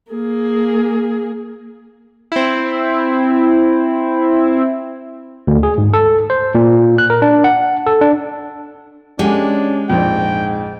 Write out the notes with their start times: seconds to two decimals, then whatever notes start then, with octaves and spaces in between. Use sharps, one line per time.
0.12 A#3 G#4
2.32 C4 E4
5.47 D2
5.63 G#4
5.78 G#2
5.93 A4
6.30 C5
6.55 A#2
6.98 F#6
7.10 A#4
7.22 D4
7.44 F#5
7.86 A4
8.01 D4
9.19 G#3 C#4 D4 G4 F#5 G#5
9.90 A#1 F2 G#2 G5